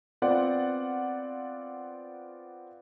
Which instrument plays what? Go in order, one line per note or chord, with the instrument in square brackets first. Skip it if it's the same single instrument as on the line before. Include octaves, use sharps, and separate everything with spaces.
[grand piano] B3 C4 F4 D5 F#5